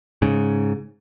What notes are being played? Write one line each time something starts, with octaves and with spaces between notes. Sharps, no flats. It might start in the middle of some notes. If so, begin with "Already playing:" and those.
G#2 C#3